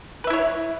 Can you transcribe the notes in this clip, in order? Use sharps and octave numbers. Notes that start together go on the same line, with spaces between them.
E4 B4 C#5 E5